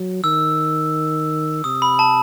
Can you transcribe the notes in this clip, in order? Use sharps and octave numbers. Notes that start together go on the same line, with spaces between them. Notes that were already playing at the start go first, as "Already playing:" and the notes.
Already playing: F#3
D#3 E6
C3 D#6
B5
A5